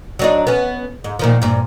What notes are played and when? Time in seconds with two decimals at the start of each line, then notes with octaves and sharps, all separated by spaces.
0.19 F#3 D4 D#4
0.47 B3 C#4
1.04 G#2
1.19 A#2 D#3 F3
1.42 G2 A#2